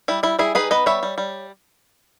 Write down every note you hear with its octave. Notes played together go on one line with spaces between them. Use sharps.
G3 E4
G3 E4
G3 E4 G#4
D#4 G#4 B4
B3 B4 D#5
G3 C#5 E5
G3
G3